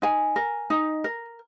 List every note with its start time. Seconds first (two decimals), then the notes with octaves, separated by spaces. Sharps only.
0.02 D#4 G#5
0.36 A#4
0.70 D#4
1.04 A#4